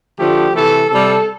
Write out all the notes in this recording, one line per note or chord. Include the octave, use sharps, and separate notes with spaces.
D3 F3 A3 G4
C3 E3 A3 A4
C3 G3 A4